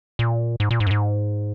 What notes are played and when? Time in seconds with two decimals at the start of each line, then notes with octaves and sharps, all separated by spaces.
0.19 A#2
0.60 G#2
0.71 A#2
0.80 G#2
0.87 F#2
0.91 G#2